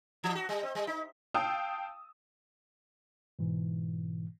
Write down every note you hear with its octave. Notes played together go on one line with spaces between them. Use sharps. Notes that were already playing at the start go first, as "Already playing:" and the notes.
E3
F#4
G3
C4
G3
D#4
F5 G5 A5 D#6 E6
G#2 B2 E3